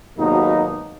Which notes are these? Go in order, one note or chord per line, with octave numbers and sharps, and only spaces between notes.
G#1 D#2 B2 F#3 A#3 D#4